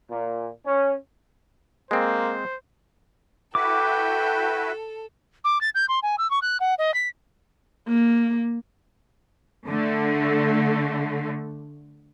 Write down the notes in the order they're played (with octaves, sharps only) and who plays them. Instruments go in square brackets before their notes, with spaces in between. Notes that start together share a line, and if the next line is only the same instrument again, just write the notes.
[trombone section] A#2
C#4
[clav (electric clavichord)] G#3 C4 [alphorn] A#3 [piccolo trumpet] C5
[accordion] E4 F#4 B4 [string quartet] A4 [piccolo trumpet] G5 [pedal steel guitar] D6
[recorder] D6
A6
G6
C6
G#5
E6
C#6
F#6
F#5
D#5
B6
[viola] A#3
[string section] D3 A3